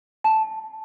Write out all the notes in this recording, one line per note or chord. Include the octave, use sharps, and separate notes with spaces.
A5